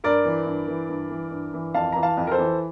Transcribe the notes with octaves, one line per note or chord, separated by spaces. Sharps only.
G2 A#4 D5
E3
G2
E3
G2
E3
G2
E3
F2 F5 A5
E3 A#5
F5 A5
F2
A#4
A4 C5
E3